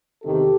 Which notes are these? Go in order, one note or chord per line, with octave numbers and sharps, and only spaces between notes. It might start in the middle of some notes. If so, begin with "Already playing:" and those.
E2 C3 D#3 G4 A4